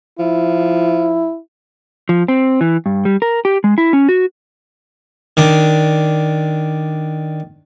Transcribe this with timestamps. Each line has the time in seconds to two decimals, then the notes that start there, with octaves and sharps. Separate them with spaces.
0.19 F3 E4
2.09 F3
2.28 C4
2.61 E3
2.86 G2
3.05 G3
3.22 A#4
3.45 G4
3.64 G#3
3.78 E4
3.93 C#4
4.09 F#4
5.37 D#3 D4